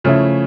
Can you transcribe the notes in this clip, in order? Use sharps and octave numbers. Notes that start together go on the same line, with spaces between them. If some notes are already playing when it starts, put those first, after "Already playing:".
C#3 F3 A3 C#4 E4